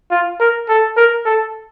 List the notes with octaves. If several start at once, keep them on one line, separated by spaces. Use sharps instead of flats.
F4
A#4
A4
A#4
A4